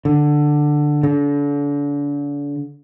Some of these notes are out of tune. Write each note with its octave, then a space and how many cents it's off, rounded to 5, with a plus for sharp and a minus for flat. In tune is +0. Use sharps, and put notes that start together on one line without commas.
D3 +10
D3 -35